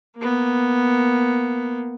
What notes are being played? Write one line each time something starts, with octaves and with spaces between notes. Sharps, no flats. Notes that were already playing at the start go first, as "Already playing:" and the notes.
A#3 B3